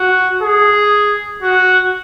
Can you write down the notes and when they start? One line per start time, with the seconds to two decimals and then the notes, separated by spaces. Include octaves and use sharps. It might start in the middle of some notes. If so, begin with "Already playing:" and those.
Already playing: F#4
0.42 G#4
1.42 F#4